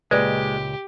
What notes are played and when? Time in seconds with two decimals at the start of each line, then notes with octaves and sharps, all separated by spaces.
0.11 C#2 A#2 G#3 G4 B4 D5